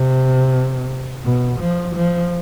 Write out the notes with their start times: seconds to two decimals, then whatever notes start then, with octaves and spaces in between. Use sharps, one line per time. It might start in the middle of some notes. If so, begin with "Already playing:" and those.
Already playing: C3
1.24 B2
1.60 F3
1.95 F3